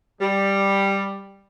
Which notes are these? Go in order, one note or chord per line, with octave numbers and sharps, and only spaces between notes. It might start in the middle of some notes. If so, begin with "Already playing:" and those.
G3